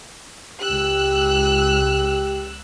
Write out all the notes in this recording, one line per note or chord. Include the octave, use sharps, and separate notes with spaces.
C#2 G4 E6 F#6